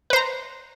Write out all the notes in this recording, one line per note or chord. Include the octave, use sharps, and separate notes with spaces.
B4 C5 A#5